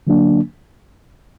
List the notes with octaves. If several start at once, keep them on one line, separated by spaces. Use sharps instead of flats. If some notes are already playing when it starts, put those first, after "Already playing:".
D3 F#3 A#3 D4